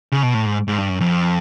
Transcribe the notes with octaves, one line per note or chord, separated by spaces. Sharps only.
C#3
B2
A2
G#2
G#2
G2
F#2
F2